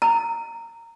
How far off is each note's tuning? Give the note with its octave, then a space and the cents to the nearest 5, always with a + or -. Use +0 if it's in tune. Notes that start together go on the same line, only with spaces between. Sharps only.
A#5 -15